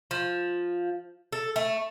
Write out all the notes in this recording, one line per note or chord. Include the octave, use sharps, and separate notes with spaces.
F3
A4
A3